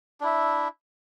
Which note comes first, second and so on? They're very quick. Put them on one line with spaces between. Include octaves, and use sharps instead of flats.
D4 E4 E5